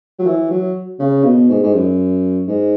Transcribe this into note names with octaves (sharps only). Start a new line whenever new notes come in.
F#3
E3
F#3
C#3
B2
G#2
G#2
F#2
G#2